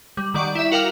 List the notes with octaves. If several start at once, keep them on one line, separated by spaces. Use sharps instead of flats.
G3
D#3 G3 D5 F#5 C#6 D7
E4 E5
F#4 A#4 F5 G5 D6 F6